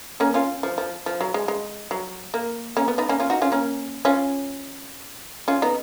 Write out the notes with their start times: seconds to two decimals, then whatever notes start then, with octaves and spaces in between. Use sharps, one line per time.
0.20 A#3 C#4
0.34 C#4 F4
0.63 F3
0.78 F3
1.06 F3
1.21 F#3
1.34 G#3
1.48 G#3
1.91 F#3
2.34 A#3
2.77 A#3 C#4
2.88 B3
2.98 B3 D#4
3.09 A#3 C#4
3.20 C#4 F4
3.30 D#4 F#4
3.42 C#4 F4
3.52 A#3 C#4
4.05 C#4 F4
5.48 C#4 F4
5.62 B3 D#4